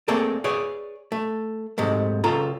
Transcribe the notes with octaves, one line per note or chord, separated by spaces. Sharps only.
A3 A#3 C4 G#4 A4 D5
G#4 B4 C#5 D5
A3
G#2 C3 G#3 A3
C#2 C#3 F4 A4 A#5